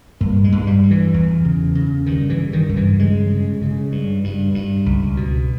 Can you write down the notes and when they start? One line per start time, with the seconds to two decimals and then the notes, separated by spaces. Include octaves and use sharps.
0.21 G2 A#3
0.44 G#3
0.52 G2
0.67 G3
0.83 G2
0.91 E3
1.14 E2
1.45 C#3
1.75 C#3
2.06 G2 D#3
2.30 E3
2.38 G2
2.53 D#3
2.69 G2
2.77 E3
3.00 C#3 G#3
3.30 C#3
3.62 C#3
3.92 G2
4.24 G2
4.54 G2
4.86 C#2
5.17 B2